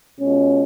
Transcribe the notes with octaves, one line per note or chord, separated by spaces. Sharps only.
B2 G#3 C#4 F4